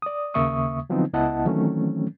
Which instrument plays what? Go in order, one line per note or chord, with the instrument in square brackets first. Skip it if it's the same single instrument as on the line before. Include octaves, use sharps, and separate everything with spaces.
[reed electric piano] D5 D#6
D#2 C#3 A#3 E5 C#6 D#6
D3 F3 F#3 B3 C4 D#4
C#2 B3 E4 D#5 F#5 A5
D#3 E3 F#3 A3 C4 C#4